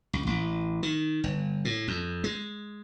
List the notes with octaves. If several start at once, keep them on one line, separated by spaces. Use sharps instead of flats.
C#2
A1
D#3
G1
A2
F2
G#3